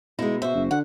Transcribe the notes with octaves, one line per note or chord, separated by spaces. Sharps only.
B2 G#3 D#4 E4
F#4 C5 E5
F#1
D3 F#5